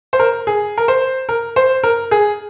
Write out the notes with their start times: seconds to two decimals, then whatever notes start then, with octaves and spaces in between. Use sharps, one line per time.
0.13 C5
0.19 A#4
0.47 G#4
0.78 A#4
0.88 C5
1.29 A#4
1.56 C5
1.83 A#4
2.11 G#4